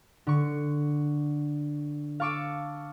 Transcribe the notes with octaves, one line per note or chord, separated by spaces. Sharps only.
D3 C#6
F5 A5 C#6 D6 E6